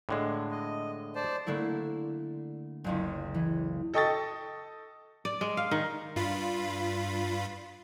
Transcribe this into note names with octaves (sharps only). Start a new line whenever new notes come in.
A2 D3 G#3
D#5
C5 D5 A5
D3 A3 A#3 E4
F#1 C#2 C#4
E3
A4 D#5 G5 C#6 D#6 A6
D5
G#3
F5
D#3
G2 F4 B5